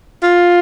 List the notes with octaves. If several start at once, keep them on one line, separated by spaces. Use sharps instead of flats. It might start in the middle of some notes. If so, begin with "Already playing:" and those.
F4